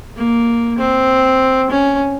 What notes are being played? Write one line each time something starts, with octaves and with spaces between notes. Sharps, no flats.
A#3
C4
C#4